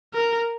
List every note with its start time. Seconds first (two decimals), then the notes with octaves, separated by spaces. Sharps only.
0.14 A#4